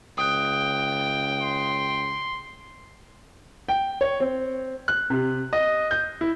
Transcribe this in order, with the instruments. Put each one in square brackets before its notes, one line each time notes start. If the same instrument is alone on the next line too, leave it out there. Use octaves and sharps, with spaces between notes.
[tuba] C#2 [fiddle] G5 [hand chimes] D#6 F#6
[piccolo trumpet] C6
[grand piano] G5
C#5
C4
F#6
C3
D#5
G6
E4